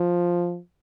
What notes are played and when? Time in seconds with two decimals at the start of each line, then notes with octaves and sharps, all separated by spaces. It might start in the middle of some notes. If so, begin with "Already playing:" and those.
Already playing: F3